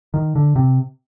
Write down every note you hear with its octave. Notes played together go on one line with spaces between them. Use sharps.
D#3
D3
C3